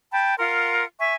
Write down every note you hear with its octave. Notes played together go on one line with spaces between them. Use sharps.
G5 A5 B5
F4 A#4 F#5 C6
E5 G#5 C#6